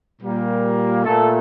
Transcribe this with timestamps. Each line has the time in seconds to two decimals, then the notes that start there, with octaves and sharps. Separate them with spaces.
0.22 A#2 G3 A#3
1.04 A#2 A3 A4